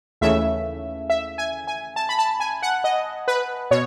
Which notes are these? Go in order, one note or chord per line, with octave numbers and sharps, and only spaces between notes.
D#2 C#3 E3 A3 C#4 E5
E5
G#5
G#5
A5
B5
A5
G#5
F#5
D#5
B4
B2 C#5